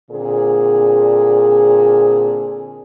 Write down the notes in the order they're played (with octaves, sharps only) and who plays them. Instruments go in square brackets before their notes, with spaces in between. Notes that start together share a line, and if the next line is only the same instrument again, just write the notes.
[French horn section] A#2 D3 C4 G#4